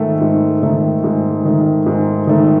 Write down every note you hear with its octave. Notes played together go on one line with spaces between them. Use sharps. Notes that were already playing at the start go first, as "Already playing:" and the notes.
Already playing: G#2 D#3 A3
G#2
D#3 A3
G#2
D#3 A3
G#2
D#3 A3